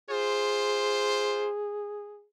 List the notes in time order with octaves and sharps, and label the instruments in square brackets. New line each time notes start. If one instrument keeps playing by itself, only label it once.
[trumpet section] F4 C5 [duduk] G#4